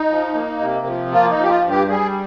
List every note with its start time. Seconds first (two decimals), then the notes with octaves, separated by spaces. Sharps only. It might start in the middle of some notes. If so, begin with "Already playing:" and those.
Already playing: D#4
0.10 F3
0.34 A#3
0.60 C3
0.86 F3
1.12 A#3 F4
1.31 D#4
1.37 F3
1.43 G4
1.50 F4
1.64 G2
1.69 G4
1.89 G3 G#4